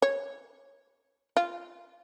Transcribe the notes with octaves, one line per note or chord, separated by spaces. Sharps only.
C#5
F4